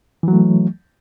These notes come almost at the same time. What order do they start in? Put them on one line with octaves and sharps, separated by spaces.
E3 F#3 A3